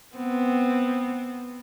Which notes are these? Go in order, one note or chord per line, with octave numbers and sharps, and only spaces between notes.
B3 C4